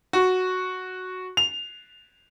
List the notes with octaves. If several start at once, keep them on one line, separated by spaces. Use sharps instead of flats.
F#4
F7